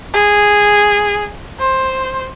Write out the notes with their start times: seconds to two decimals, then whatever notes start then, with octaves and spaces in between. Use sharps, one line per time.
0.13 G#4
1.59 C5